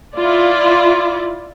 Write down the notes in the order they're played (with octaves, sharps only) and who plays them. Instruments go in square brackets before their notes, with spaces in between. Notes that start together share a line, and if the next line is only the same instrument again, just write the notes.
[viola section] E4 F4 D5